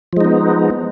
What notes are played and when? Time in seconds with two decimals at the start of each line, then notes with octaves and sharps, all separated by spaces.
0.13 F3
0.17 G#3
0.21 D#4
0.25 B3